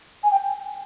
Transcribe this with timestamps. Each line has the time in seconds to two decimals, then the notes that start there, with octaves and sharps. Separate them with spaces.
0.23 G#5
0.31 G5